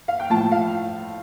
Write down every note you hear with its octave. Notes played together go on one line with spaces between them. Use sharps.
F5
G5
A2 F3 A5
F5